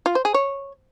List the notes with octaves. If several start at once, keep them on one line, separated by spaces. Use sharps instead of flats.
F4
C5
G#4
C#5